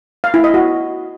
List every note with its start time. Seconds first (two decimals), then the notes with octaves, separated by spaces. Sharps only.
0.24 F5
0.34 E4
0.44 D#5
0.54 F#4